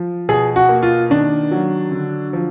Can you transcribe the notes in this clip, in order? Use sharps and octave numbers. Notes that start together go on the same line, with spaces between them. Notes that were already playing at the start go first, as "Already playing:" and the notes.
Already playing: F3
B2 G#4
F#4
A#3
F4
D#3 D4
F#3
D3
F3